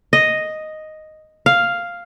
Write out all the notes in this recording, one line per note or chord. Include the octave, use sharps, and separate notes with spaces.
D#5
F5